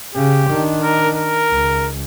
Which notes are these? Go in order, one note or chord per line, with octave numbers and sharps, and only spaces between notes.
C#3 G4
D#3 D4
A#4
A#4
C#2